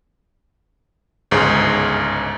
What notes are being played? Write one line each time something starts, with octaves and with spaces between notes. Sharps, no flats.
G1 C#2 G#2 G#4